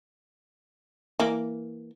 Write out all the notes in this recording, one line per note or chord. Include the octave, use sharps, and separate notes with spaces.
E3 A#3